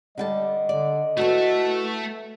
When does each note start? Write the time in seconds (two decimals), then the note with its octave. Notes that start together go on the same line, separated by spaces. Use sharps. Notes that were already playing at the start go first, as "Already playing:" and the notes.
0.18 D3 G3 D#5 G5 A5
0.69 D3 D5
1.17 A3 E4 F#4 A4 B4